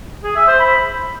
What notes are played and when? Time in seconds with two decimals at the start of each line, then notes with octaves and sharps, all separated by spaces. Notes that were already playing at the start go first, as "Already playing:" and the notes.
0.24 G#4
0.35 E5
0.47 C5
0.59 B5